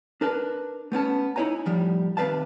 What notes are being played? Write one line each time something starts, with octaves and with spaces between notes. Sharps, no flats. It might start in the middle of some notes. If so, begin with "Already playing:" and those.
D4 A#4 B4 A5
A3 B3 C#4 A5
D#4 E4 G#4 C#5 G#5 A#5
A2 F3 G3
D#2 C3 B4 F5 A5